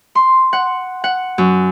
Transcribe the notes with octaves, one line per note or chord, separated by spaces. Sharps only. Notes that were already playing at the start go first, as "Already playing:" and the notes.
C6
F#5
F#5
F#2